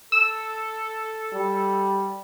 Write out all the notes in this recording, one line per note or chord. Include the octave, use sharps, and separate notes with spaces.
A4 E6
G3